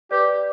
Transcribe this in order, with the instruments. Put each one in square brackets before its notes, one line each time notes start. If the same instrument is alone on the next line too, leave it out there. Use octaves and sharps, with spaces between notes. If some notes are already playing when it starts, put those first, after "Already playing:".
[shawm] G4 [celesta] B4 D5